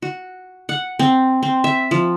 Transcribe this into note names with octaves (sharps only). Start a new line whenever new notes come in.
F#4
F#5
C4
C4
E5
F3